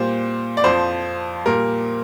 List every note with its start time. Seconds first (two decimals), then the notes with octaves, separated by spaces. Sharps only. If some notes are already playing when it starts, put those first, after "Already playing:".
Already playing: A#2 G3 C5
0.57 D5
0.64 F2 F3 C5
1.46 A#2 G3 A#4